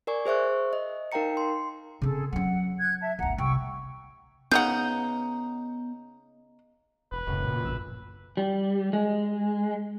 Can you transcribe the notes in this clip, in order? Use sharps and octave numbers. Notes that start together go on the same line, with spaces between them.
A#4 D5 G#5 C#6
G#4 C5 E5 C#6 F#6
D#5
D#4 A#4 F5 G5 A#5 C#7
C6
C#3 C4 G#4 A4
F#3 C#4 F#5
F#6 G#6
E5 A5
G1 D2 F#5 A#5
C2 G5 C#6 E6
C#3 B3 D#4 F#5 G6
E1 B4
E1 F#2 A2 C#3
A#2
A#1 E6
G3
G#3